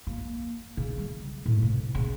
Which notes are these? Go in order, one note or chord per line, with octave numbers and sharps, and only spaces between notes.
A#3
C#3
G3
A2
C3
C#3